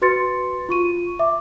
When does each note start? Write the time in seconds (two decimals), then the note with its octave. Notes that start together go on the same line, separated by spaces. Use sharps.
0.02 F#4 B4 C6 A6 C#7
0.69 F4 C#6 D#7
1.19 E5 D6